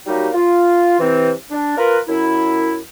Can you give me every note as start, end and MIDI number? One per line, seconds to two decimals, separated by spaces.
0.07 0.28 54
0.07 0.28 55
0.07 0.28 58
0.07 0.28 63
0.07 0.28 66
0.07 0.28 67
0.34 0.98 65
1.00 1.31 48
1.00 1.31 52
1.00 1.31 60
1.51 1.74 62
1.77 1.98 65
1.77 1.98 70
1.77 1.98 71
2.08 2.77 42
2.08 2.77 64